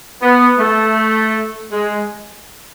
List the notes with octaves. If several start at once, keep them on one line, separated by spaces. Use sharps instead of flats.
B3
A3
G#3